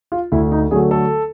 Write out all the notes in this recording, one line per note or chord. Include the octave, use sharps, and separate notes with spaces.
F4
D2 E4
D#4
D3 F#3 A3 G#4
A4